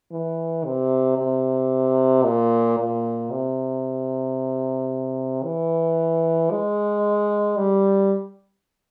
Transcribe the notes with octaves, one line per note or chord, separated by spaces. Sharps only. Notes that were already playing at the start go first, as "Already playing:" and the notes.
E3
C3
C3
A#2
A#2
C3
E3
G#3
G3